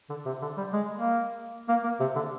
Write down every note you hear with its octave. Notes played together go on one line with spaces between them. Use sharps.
D3
C3
D3
G3
G#3
A#3
A#3
A#3
C3
D3